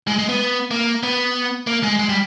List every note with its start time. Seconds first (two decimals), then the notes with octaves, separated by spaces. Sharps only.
0.07 G#3
0.19 G#3
0.29 B3
0.71 A#3
1.03 B3
1.67 A#3
1.83 G#3
1.99 G#3
2.09 G3